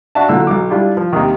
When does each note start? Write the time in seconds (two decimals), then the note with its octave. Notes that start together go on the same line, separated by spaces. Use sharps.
0.15 D4 F#4 E5 A5
0.29 B1 A#2 D3 E4 E6
0.47 B1 D6
0.70 G3 D4 E4 F4 G4
0.97 F3
1.13 D#2 C3 D#3